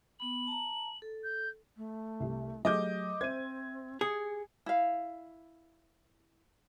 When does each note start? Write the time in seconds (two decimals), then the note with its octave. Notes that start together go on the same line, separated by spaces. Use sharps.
0.20 B3 B5 F#7
0.47 A5 A#5
1.02 A4
1.24 G6
1.77 A3
2.20 C2 G4
2.65 F#3 A3 G4 G#4 D#5 D6 G6
3.21 C4 C5 E5 G#6 D#7
4.01 G4 G#4 C#7
4.66 E4 F5